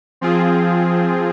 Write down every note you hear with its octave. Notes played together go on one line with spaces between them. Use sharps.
F3 C4 F4 G#4